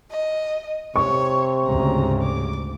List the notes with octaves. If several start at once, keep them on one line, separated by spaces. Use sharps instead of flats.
D#5
C3 C#5 C#6
D2 G#2 C#3 A#5
D6